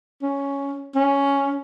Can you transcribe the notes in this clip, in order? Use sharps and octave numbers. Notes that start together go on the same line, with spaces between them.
C#4
C#4